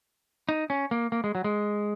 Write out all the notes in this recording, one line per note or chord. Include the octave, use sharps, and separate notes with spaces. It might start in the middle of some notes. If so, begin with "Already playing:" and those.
D#4
C#4
A#3
A#3
G#3
F#3
G#3